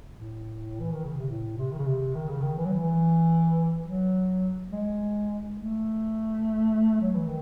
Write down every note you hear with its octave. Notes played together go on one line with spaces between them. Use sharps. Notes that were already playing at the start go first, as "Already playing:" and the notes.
A2
E3
D#3
C#3
C3
A2
C3
D#3
C#3
C3
D#3
C#3
D#3
E3
F#3
E3
F#3
G#3
A3
F#3
E3
D#3